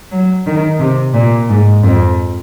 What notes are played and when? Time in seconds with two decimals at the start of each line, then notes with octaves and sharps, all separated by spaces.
0.12 F#3
0.46 D#3
0.80 C3
1.14 A#2
1.49 G#2
1.83 F2